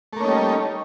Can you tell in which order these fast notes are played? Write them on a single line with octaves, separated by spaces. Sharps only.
A3 A#3 C#4 D#4 G3